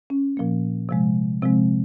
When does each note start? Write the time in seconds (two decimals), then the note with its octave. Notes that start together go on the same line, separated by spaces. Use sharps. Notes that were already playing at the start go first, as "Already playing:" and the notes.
0.10 C#4
0.37 A#2 F3 A#3
0.89 C3 F3 G#3
1.42 C3 F3 G#3 C4